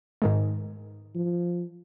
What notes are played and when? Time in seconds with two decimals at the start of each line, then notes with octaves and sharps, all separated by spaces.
0.22 G#2 D#3 G#3
1.15 F3